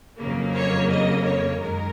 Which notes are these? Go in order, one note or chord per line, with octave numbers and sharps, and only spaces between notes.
F2 C#3 F#3 A#3
C#5
D#5
C#5
F#2 D#3 G#3 A#4